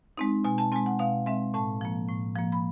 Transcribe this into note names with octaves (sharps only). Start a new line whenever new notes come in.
G#3 C4 D#4
B2 G#5
A5
G#3 C4 G#5
F#5
B2 F5
G#3 C4 E5
A2 A5
F3 A#3
A2
F3 A#3
B5